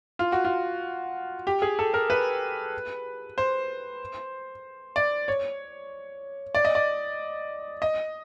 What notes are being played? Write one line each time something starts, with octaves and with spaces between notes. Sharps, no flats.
F4
F#4
F4
G4
G#4
A4
A#4
B4
C5
D5
C#5
D5
D#5
D5
D#5